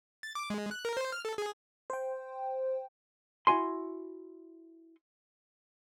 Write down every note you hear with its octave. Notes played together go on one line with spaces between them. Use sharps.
A6
D6
G#3
F#6
A#4
C5
F6
A4
G#4
C5 G5
E4 F#4 G#5 C6